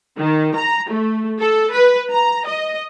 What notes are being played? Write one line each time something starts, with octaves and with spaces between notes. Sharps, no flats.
D#3
A#5
A3
A4
B4
A#5
D#5